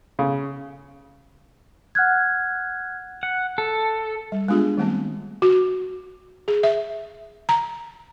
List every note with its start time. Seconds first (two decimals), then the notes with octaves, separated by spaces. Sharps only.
0.19 C#3
1.95 F#5 F6 F#6 G#6
3.23 F#5
3.58 A4
4.32 G3
4.48 G#3 B3 D4 F4 G4 G#4
4.78 D#3 G3 A3 B3 C4
5.42 F#4
6.48 G#4
6.63 E5
7.49 A#5